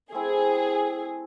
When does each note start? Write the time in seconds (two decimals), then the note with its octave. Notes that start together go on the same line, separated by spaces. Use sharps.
0.12 A3 C4 E4 G#4